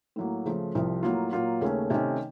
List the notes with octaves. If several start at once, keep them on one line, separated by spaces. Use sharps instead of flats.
A2 F#3 A#3
C#3 F3 A3
C2 C3 F3
A2 F#3 A#3 F4
A#2 F#3 A#3 F4
D#2 C#3 A3 C#4
C3 D#3 A3 C#4